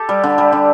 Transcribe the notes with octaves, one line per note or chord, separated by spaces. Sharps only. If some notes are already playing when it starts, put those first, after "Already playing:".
Already playing: G4 A4
G3
D3
G3
D3